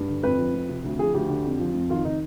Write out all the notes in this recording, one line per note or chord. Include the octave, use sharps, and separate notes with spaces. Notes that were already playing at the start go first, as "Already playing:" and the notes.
Already playing: G2
D3
F2 B4
F3
F2
C3
D2
F3 G#4
D2 G4
D3
F2
F3
F2
D#3 F4
D#3 D#4